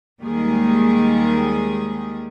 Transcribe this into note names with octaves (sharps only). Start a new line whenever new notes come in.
D#2 D#3 G3 G#3 G#4